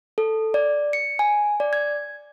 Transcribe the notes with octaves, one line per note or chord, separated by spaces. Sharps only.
A4
D5
C#7
G#5
D5
G#6